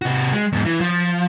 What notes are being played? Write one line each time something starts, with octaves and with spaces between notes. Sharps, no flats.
C3 F#4
G#3
E2 G#2
E3
F3